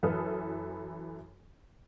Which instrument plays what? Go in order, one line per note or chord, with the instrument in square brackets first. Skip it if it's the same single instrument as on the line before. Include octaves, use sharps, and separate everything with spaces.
[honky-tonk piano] F#2 E3 A4 B4 D#6 F6